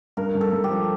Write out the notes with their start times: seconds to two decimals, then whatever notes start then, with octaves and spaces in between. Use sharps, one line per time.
0.17 G2 A#4
0.35 G2
0.41 A4
0.53 G2
0.64 G4
0.70 F3